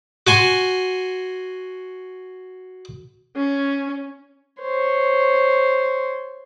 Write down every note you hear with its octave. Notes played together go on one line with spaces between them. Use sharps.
F#4 G#5 C6
C#4
C5 C#5